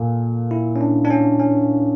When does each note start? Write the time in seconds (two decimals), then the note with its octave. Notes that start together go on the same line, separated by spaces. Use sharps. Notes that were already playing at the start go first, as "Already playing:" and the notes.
Already playing: A#2 A4
0.51 E4
0.76 C#4
0.81 D4
1.05 D4
1.10 C#4
1.39 C#4